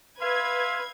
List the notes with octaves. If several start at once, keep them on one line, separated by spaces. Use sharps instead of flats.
B4 E5 F5 C6 G#6